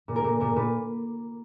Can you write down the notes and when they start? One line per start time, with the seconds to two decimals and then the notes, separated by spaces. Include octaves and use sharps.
0.08 A#2
0.16 A#4
0.24 A#2
0.40 A#2 A#4
0.56 A#2 B4